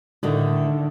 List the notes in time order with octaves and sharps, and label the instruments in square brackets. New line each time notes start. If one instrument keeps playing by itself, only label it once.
[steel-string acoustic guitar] A2 D#3 A3 [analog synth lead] D3